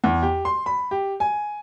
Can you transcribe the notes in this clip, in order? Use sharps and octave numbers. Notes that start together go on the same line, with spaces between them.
E2
G4
C6
B5
G4
G#5